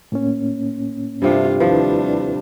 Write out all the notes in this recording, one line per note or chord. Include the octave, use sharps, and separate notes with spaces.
A2 A#3 C#4
G2 C3 A3 D4 F4
D#2 F3 G3 D4 E4 B4